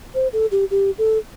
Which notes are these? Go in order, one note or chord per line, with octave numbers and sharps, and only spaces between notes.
C5
A4
G4
G4
A4